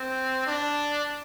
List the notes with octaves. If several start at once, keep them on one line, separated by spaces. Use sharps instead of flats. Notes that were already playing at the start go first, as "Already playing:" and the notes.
Already playing: C4
D4